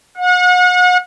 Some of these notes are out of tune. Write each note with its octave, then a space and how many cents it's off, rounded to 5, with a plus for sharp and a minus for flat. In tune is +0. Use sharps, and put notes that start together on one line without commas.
F#5 -40